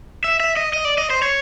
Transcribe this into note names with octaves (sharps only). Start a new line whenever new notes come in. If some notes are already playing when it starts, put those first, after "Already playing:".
E5
E5
D#5
D#5
D5
D#5
C5
C#5